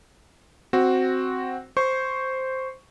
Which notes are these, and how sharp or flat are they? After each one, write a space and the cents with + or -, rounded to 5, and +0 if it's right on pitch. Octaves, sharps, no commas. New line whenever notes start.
C4 +0 F#4 +0
C5 +0 C#6 +0